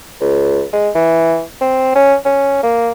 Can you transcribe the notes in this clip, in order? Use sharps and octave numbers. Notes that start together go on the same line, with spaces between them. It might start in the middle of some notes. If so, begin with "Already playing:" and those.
C#2
G#3
E3
C4
C#4
C#4
A#3